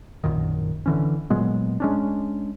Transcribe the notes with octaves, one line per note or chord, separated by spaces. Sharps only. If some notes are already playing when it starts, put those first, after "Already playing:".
A#1 F#2 A#2 D#3
D3 E3 C#4
A#2 F#3 G#3 B3
G#3 C#4 D4